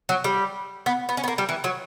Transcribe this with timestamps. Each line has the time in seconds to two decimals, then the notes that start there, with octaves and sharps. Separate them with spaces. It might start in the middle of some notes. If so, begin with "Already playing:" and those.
0.09 F#3
0.24 G3
0.86 B3
1.09 B3
1.17 C#4
1.24 B3
1.28 A#3
1.38 G3
1.49 E3
1.64 F#3